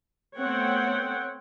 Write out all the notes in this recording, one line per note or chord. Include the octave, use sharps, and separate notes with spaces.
A3 B3 C4 C#5 F#5 G5